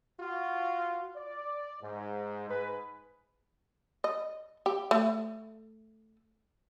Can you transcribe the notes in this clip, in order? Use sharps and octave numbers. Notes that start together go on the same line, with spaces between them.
F4 F#4
D5
G#2
G#2 G#4 B4
D#5
G4
A3